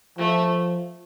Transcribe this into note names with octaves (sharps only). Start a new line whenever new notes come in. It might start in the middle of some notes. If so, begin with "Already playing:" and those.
F3 A3